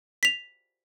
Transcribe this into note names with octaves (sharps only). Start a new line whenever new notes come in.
B6 F7